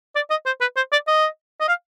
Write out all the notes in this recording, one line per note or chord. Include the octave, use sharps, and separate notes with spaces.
D5
D#5
C5
B4
C5
D5
D#5
D#5
F5